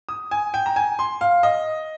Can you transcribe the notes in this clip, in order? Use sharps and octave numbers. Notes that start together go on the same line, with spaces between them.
D#6
G#5
G5
A#5
G#5
C6
F5
D#5